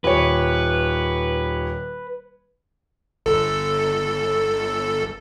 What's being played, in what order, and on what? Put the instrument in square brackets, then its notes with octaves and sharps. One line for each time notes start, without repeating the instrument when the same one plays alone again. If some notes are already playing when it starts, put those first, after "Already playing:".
[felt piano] D#1 C#5 [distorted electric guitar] B4
[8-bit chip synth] G1 A4